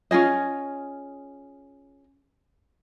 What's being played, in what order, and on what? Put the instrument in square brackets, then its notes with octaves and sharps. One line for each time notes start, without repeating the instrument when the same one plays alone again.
[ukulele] C#4 F4 G#4 D#5